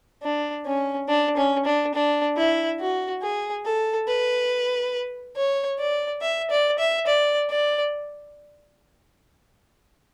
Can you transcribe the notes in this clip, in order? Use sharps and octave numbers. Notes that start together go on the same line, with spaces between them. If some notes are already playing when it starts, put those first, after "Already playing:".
D4
C#4
D4
C#4
D4
D4
E4
F#4
G#4
A4
B4
C#5
D5
E5
D5
E5
D5
D5